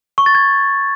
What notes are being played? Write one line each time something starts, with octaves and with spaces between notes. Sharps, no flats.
C#6
A6
G#6